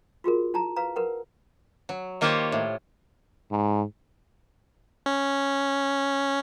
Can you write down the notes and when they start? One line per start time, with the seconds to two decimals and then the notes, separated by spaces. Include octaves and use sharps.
0.24 F4 F#4 G#4 A#4
0.54 E4 A5 A#5
0.76 B4 F5 A#5
0.96 A#4 B4 F#5
1.89 F#3
2.21 D#3 A#3 F4 G4 C5 C#5
2.52 A2
3.51 G#2
5.06 C#4